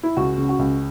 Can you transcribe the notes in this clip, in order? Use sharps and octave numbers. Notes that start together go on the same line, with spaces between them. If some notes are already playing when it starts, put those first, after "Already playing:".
E4
C#2 F#4
C#3
F#4
C#2